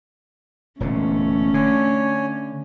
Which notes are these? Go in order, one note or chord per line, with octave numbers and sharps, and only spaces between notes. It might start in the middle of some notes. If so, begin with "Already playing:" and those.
E1 A#2 D3 A3 C#4
D3 C#5 G#5